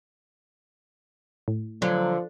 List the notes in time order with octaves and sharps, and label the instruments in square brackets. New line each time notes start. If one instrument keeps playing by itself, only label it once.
[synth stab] A2
[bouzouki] D3 [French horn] F3 [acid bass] F#3